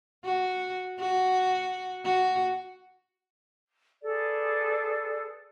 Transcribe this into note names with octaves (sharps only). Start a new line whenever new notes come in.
F#4
F#4
F#4
G#4 A4 B4 D5